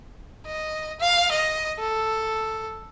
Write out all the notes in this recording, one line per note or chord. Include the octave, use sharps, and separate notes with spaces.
D#5
F5
D#5
A4